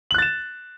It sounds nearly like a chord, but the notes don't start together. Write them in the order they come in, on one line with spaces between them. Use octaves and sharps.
F#7 F#6 A6 E7